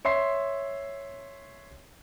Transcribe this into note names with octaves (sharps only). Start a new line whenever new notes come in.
C#5 E5 C6 C7